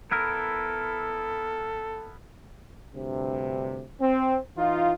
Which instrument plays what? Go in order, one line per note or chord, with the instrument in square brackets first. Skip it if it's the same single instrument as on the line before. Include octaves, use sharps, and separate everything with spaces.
[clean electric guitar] B3 E4 A#4 [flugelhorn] A4
[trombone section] D2 G2 C3
C4
E3 D#4 F4